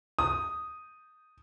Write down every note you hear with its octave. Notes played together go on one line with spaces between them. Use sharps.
D#6